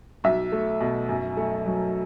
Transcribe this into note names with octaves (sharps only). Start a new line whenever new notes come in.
B1 E5
A3
B2
F#2
A3
F#3